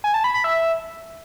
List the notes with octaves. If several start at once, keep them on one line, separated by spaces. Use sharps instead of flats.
G#5
A5
B5
B5
E5